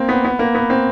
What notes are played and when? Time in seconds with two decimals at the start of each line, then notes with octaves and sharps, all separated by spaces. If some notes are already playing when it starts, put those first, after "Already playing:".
Already playing: A#3 C4
0.09 B3
0.25 B3
0.39 A#3
0.55 B3
0.70 C4